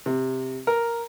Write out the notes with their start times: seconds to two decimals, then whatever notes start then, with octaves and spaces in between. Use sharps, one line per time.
0.06 C3
0.67 A#4